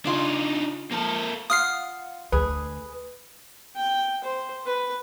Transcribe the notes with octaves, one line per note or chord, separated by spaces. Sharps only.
C#3 D4 D#4 F4
F3 A#3 A4
F4 F5 F#5 D#6 F6 C7
D2 G#4 B4
G5
C5
B4